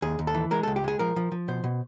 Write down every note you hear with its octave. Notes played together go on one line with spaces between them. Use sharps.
D#2 G#4
D#2
A4
E3
G#3 A#4
A4
C#2
G4
G#3 G#4
F3 A#4
F3
F3
B2 C5
B2